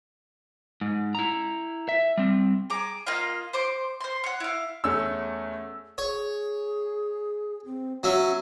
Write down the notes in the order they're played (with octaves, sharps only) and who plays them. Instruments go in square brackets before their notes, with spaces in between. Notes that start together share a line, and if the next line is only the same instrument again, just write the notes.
[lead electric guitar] G#2
E4 A#5
E5
G3 C4
[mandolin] G#4 A#5 D6
A#3 F4 D#5 F5
C5 C6 D6
C5 C6
C#5 F#5
E4 F5
[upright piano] E2 A3 C#4 E6
[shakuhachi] G#4 [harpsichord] C#5
[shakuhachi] C4
[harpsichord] F#3 C#4 E5 [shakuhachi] B3